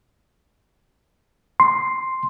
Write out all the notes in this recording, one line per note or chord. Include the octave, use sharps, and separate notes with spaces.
C6